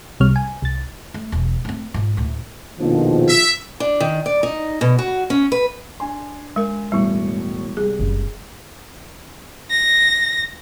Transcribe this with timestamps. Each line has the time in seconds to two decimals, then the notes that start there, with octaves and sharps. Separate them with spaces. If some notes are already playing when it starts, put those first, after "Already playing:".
0.20 C2 C3 G3 C#5 F6
0.36 G#5
0.62 C2 A6
1.14 A3
1.32 E1
1.65 A3 C4
1.94 G#2 F3
2.17 D2 A2
2.80 A#1 F2 B2 D#3 F3
3.28 E5
3.80 D4
4.00 D#3
4.26 D5
4.43 D#4
4.81 B2
4.99 F#4
5.30 C#4
5.52 B4
6.00 D4 G#5 C6
6.56 G#3 A#4
6.92 E1 A2 G3 C#6
7.77 C2 G#4
7.99 F#1
9.70 A#6